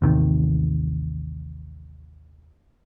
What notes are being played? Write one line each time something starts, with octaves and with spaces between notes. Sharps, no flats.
A1 D#2 C3 D#3